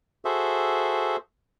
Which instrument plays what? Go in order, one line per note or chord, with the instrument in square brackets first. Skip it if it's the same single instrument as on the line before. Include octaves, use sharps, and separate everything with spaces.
[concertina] F#4 G#4 A4 C5 E5